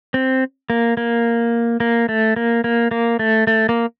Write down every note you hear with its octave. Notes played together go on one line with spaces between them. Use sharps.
C4
A#3
A#3
A#3
A3
A#3
A#3
A#3
A3
A3
A#3